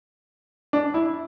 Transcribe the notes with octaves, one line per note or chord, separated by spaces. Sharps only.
D4
E4